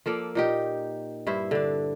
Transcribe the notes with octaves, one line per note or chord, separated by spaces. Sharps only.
F3 A#3 A4 D5
A#2 D#4 G4
G2 E4 C5
D3 D4